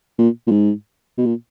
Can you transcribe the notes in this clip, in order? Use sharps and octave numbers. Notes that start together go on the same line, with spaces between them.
A#2
A#2
G#2
B2
A#2